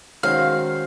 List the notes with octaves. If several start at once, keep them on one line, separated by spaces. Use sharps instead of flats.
D#3 G#3 C#4 F#4 C5 F5